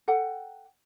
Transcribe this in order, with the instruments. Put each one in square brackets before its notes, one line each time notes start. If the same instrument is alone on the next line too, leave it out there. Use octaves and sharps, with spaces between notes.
[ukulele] A4 F#5 G5